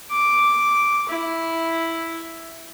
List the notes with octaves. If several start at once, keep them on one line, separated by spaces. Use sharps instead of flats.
D6
E4